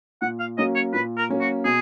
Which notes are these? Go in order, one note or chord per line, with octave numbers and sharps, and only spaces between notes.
A#2 F#5
F5
F#3 A#3 C#4 D#5
C#5
A#2 B4
A#4
F#3 A#3 C#4
F#4
B2 G#4